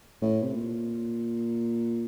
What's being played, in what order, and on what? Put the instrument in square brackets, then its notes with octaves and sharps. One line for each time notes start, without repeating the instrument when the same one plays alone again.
[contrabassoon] A2
C3
A#2